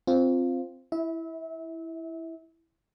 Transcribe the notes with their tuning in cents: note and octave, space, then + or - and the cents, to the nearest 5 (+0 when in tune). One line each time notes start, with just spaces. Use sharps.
C4 +0 F4 +0
E4 +0 E5 -30